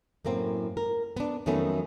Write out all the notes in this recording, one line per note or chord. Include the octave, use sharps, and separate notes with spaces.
F#2 A2 A#3 C4
A#4
B3 D4
F2 D#3 F#3 A3 B3 C#4